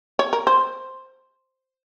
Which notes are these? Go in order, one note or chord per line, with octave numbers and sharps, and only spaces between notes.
C#5
A#4
C5